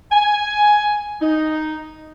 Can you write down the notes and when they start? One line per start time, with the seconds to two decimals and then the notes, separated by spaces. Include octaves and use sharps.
0.12 G#5
1.22 D#4